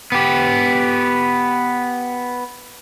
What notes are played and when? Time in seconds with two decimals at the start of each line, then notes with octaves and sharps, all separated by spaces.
0.12 B3 G4